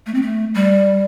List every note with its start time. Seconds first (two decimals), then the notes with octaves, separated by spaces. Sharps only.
0.06 A3
0.14 C4
0.22 A3
0.55 G3